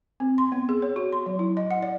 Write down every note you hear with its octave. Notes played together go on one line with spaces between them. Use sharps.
C4
C6
B3
G#4
C#5
F#4
C6
F#3
E4
D#5
F#5
D5